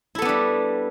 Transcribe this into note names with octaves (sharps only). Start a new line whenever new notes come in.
G3 B3 D4 E4 A4